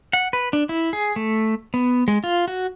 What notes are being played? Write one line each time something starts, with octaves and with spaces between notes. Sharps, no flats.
F#5
B4
D4
E4
G#4
A3
B3
G#3
F4
F#4